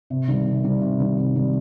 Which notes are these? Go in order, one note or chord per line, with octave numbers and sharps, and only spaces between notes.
C3
D#3 G3
C3
D#3 G3
C3
D#3 G3
C3
D#3 G3